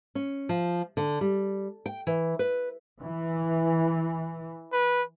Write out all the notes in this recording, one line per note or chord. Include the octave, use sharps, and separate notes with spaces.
C#4
F3
D3
G3
G5
E3
B4
E3
B4